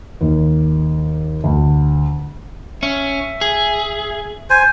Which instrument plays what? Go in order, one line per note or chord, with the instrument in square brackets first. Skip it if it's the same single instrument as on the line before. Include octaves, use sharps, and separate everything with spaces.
[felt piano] D#2
D2
[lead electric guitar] C#4 [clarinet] E5
[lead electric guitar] G#4
[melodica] C5 G#5